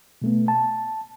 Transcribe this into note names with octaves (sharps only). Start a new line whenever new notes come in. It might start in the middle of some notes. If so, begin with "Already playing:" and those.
B2 A3 B3
A5